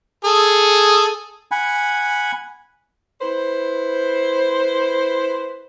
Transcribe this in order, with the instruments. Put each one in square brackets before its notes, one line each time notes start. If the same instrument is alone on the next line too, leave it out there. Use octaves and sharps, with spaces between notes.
[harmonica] G#4 A4
[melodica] F#5 G#5 B5
[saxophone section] E4 B4 C5